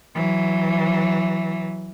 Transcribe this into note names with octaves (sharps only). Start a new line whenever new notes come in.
E3 F#3